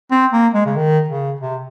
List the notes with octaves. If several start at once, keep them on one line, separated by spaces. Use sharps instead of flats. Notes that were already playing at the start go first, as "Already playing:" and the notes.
C4
A#3
G#3
C#3
D#3
C#3
C3